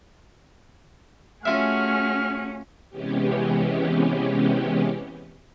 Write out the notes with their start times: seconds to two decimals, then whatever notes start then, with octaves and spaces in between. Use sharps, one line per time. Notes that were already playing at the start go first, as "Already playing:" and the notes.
1.45 A3 C#4 F4 F#4 G#4 E5 F6
2.89 C3 E3 G#3 B3 C#4 G4